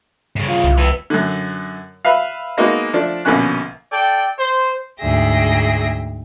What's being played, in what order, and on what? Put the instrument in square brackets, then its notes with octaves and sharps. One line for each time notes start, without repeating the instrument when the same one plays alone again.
[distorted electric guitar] G2 C#3
[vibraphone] F4 F5
[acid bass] C2
[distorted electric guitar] E3 B3 [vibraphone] B4 E6
[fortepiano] F#2 D3
B4 E5 F5
G#3 A#3 B3 D#4 F#4
F3 A3 D4
A#1 B2 D3 A#3 C#4 F#6
[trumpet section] A4 D5 G5
C5
[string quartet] D2 G#2 G#4 E5 G5 A#6